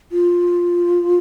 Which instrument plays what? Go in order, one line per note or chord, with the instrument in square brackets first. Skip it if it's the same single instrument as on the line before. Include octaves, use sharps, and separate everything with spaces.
[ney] F4